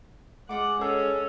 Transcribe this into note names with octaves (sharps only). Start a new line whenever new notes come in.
G#3 F4 D5 F#5 D6
C#4 G#4 A4